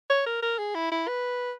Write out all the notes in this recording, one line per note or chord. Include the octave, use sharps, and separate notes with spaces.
C#5
A#4
A#4
G#4
E4
E4
B4